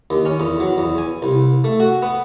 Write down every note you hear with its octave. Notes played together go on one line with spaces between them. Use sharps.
D#2
C#4
E2
F#3
E2
G#5
C2
A3
F#4
B3